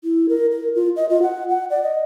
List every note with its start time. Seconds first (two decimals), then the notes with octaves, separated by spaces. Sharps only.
0.04 E4
0.29 A#4
0.51 A#4
0.75 F4
0.96 D#5
1.09 F4
1.22 F#5
1.49 F#5
1.70 D5
1.83 D#5